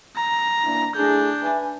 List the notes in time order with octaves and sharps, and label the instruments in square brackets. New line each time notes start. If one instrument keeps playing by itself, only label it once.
[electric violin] A#5
[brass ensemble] E3 A#3 D4
[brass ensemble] A3 E4 G#4 [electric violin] D4 G6
[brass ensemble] B4 E5 G#5